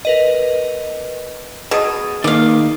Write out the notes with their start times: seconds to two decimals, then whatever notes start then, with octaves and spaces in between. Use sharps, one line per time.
0.05 A#4 B4 D#5
1.71 B2 G#4 D#6
2.24 D#3 A#3 D5 F5